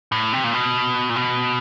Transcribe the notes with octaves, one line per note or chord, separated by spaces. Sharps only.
A2
C3
A#2
B2
A#2
B2